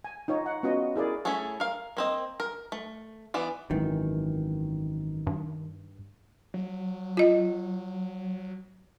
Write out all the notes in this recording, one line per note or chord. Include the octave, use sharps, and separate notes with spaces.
G#5
D#4 F4 C#5
F#5
B3 C#4 F4 F#4 D#5
E4 G#4 A#4 D5
A3 C#4 E4 G#4 A4
A#4 F5
A#3 C4 D#5
A#4
A3
E3 B3 D5
G#1 F#2 D#3 E3
G2
F#3
F4 D#5